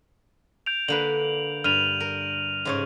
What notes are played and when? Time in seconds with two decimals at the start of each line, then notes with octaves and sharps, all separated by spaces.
0.66 G6 D7 F7
0.88 D3 A#3 B4 F#7
1.64 G2 F6 D#7 F7
2.00 A#4
2.65 G#2 C#3 C#5